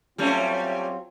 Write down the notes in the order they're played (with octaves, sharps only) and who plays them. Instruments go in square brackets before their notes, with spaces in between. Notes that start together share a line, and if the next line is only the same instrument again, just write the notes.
[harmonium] F#3 C4 F4 [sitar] G3 A3 C#4